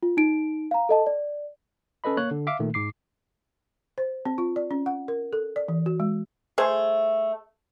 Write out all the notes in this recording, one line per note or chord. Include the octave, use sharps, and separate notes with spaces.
F4
D#4 D7
F5 A#5
A4 D#5 A5
D5
C#4 A4 B4 D#5 B5
A#3 C#5 F#6
D3
E5 F5 D6
A#2 D#3 A3
G#2 D6 C7
C5
C4
F4
D5
C#4
F#5
A#4
A4
D5
E3
F#4
G#3
A3 G#4 C5